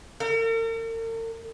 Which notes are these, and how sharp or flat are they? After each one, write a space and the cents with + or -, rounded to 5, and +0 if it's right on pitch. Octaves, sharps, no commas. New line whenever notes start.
A#4 -45